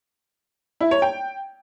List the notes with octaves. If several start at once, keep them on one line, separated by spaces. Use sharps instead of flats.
E4
C#5
G5